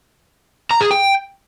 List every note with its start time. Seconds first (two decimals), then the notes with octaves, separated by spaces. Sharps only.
0.71 A#5
0.81 G#4
0.91 G5